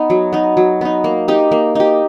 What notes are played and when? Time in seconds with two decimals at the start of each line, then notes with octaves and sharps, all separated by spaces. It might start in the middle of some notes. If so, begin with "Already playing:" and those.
Already playing: B3 D#4
0.10 F#3
0.33 B3 D#4
0.57 F#3
0.81 B3 D#4
1.04 A#3
1.28 D#4 G4
1.52 A#3
1.75 D#4 G4